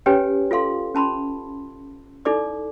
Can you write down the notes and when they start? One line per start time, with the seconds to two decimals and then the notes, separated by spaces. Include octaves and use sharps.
0.06 C#4 G4 B4 C#5 G5 G#5
0.51 F4 A4 F5 C6
0.95 C#4 A5 B5 C6
2.25 D#4 E4 A4 D5 D6